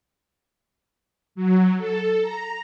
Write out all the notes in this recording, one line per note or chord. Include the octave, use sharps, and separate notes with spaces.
F#3
A4
A#5